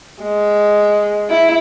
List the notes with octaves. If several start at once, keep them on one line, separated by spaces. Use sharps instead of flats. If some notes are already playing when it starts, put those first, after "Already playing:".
G#3
E4